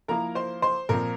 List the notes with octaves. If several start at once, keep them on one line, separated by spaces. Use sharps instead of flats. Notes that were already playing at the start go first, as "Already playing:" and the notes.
F3 A#3 E4 A#4 A#5
C5 C6
C5 C6
A#2 F3 C4 A#4 A#5